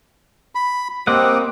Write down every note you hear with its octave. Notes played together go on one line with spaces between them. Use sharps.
B5
A#3 C4 G4 D#5 F#5